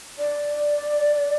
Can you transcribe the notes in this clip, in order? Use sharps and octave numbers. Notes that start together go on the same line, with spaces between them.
D5